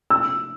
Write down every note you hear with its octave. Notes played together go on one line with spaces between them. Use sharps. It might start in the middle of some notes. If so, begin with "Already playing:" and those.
E6